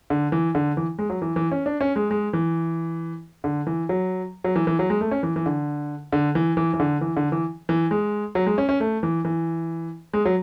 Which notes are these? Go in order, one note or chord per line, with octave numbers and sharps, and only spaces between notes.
D3
E3
D3
E3
G#3
F#3
E3
E3
C#4
D4
C#4
G#3
G#3
E3
D3
E3
F#3
F#3
E3
E3
F#3
G#3
A3
C#4
E3
E3
D3
D3
E3
E3
E3
D3
E3
D3
E3
E3
G#3
F#3
G#3
C#4
C#4
A3
E3
E3
G#3
F#3